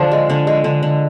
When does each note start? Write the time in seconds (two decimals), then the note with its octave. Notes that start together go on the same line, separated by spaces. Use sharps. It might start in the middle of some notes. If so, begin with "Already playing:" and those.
Already playing: D3 F3 D4 F4
0.11 G#3
0.30 D3
0.47 G#3
0.64 D3
0.83 D3